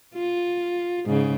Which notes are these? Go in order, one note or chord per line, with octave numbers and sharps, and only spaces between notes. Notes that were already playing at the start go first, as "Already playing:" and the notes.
F4
G#2 C#3